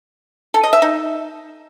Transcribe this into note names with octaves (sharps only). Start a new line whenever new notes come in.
A4
D#5
E5
D#4